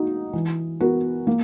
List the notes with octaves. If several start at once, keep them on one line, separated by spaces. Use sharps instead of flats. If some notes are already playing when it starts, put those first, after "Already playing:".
Already playing: A#3 D#4 F#4
E3
B3 F#4 A#4
A#3